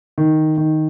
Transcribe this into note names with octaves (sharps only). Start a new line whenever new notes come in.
D#3
D#3